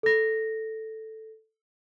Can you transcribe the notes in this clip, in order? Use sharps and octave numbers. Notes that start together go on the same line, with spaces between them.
A4 A#6